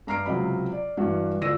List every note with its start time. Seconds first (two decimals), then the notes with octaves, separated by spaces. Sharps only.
0.07 G2 A#5 F6 C7 D7
0.26 C#2 C3 F#3 D#5 B5
0.72 D5
0.97 G2 E3 G3 F#4
1.41 D2 F4 D5 E6 A#6 D#7